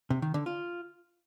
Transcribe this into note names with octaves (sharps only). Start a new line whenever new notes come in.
C3
D#3
D3
F4